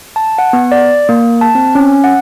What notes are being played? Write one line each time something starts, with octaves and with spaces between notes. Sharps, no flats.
A5
F#5
B3
D5
A#3
A5
C4
C#4
F#5